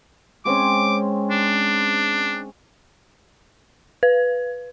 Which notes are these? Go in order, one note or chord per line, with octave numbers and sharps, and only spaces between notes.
G#3 C4 C#4 D6
D4
B4